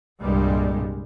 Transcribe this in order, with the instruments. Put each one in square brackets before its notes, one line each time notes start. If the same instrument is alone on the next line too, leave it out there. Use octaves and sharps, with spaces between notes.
[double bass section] C2 G2 A#2 G3 G#3